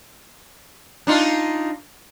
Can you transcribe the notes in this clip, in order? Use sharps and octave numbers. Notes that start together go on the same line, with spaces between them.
D4 D#4 F4